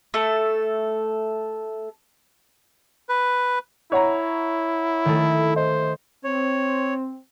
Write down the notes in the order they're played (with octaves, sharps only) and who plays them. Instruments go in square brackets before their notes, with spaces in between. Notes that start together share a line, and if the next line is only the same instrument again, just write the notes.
[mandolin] A3 A4
[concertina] B4
[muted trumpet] E4 [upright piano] C#5 F#5 A#5
[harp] D#3 A3
[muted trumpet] C5 [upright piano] D#5
[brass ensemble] C4 [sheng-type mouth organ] C#5